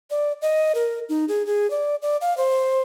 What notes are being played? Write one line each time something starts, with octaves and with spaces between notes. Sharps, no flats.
D5
D#5
A#4
D#4
G#4
G#4
D5
D5
F5
C5